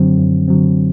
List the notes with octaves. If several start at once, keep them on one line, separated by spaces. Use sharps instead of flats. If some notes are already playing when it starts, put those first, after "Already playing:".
Already playing: F#2 D3 F#3 C4
F#2
D3 F#3 C4